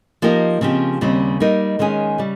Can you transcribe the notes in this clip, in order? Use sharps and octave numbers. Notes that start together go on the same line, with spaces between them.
F3 A#3 D#4 G4 A#4
C#3 F3 C4 G4
D#2 C#3 G3 C4
G3 A#3 D#4 A#4
D#3 G#3 C#4 G#4
C#3 G3